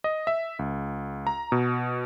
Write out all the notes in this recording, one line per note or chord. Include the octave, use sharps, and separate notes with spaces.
D#5
E5
C#2
A#5
B2